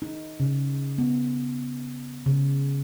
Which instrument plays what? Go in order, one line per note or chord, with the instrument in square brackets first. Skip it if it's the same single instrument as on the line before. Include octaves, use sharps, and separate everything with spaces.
[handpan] D#4
C#3
B3
C#3